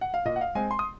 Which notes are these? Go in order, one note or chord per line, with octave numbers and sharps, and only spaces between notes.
F#5
F5
A#2 D#5
F#5
F5
G#3 C4 G#5
C6
D#6